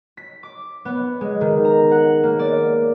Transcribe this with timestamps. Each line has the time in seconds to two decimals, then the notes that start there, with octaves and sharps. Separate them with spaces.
0.17 B6
0.43 D6
0.85 B3
1.21 G#3
1.41 D#3
1.65 A#5
1.91 F#5
2.23 A#3
2.39 D5